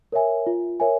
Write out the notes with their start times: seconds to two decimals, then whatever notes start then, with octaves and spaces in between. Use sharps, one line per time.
0.12 A#4 C#5 E5 G#5
0.47 F4
0.80 A#4 C#5 E5 G#5